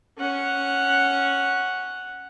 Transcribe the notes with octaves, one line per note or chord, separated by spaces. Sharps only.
C#4 F#5